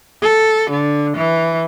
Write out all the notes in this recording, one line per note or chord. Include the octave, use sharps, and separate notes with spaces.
A4
D3
E3